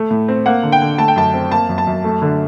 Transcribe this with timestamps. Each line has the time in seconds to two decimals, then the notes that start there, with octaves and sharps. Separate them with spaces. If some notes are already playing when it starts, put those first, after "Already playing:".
Already playing: A3
0.10 A2
0.28 C4
0.46 A#3 F#5
0.63 D3
0.72 G5
0.82 D3
0.98 A3 A5
1.08 G5
1.16 F#2 A5
1.34 C4
1.51 A#3 A5
1.69 F#2
1.78 A5
1.87 F#2
2.04 A3
2.22 D3